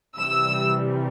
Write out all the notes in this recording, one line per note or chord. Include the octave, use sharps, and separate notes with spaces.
C3 E3 G3 E6